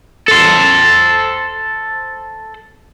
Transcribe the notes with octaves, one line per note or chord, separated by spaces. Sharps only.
A4 C5